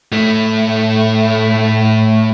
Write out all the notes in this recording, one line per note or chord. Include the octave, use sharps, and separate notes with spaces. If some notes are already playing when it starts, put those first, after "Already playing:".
A2 A3